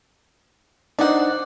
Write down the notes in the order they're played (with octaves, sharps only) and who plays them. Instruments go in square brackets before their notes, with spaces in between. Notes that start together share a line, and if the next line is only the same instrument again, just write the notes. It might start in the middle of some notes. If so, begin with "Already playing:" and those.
[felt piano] D4 D#4 C5 [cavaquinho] D5 F#5